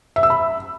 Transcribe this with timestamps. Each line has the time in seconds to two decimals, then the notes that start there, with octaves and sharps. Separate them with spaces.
0.16 E5
0.23 E6
0.30 B5